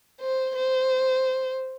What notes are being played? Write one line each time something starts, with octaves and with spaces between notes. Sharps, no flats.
C5
C5